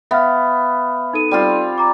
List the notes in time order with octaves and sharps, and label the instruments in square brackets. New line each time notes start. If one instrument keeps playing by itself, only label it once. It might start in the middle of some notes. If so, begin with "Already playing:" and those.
[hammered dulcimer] B3 [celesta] E5 F5 F6
[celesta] D#4 A4 D#7
[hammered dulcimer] G3 C4 F4
[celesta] A#5 D6